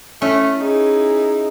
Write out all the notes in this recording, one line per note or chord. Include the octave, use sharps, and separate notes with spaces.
A3 C#4 E4
D#4 E4 G#4